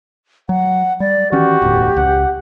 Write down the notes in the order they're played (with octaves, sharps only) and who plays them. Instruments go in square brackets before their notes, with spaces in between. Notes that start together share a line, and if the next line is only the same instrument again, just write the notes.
[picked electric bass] F#3 [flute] F#5
[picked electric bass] G3 [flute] D5
[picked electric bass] D#3 E3 C#4 [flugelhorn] F#4 [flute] G4
[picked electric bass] E1 D2 A2
[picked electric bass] C#2 [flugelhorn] F#5